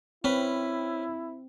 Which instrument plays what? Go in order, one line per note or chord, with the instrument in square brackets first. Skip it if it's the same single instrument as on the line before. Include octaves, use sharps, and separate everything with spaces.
[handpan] C4 [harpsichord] C#4 B4 [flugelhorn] E4